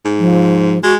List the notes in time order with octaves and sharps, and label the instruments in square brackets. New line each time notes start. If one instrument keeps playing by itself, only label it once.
[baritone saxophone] G#2
[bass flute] F3
[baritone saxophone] G#3 [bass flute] F#4